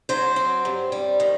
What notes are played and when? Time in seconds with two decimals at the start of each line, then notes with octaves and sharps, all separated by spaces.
0.09 F#3 C5
0.36 C4
0.65 G2
0.92 G3
1.20 D#3